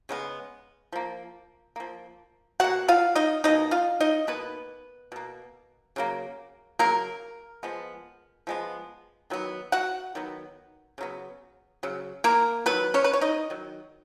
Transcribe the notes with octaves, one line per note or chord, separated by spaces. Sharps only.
C#3 G#3 B3
F3 A#3
F3 A#3
B2 A#3 F#4 F#5
F4 F5
D#4 D#5
B2 A#3 D#4 D#5
F4 F5
D#4 D#5
B2 A#3 B3 B4
B2 A#3
C#3 F#3 A#3
C#3 F#3 A#3 A#4
F3 G#3 B3
F3 G#3 B3
D#3 F#3 B3
F#4 F#5
D#3 F#3 B3
C#3 F#3 B3
C#3 F#3
A#3 A#4
D#3 F#3 B3 B4
C#4 C#5
B4
C#5
D#4 D#5
D#3 F#3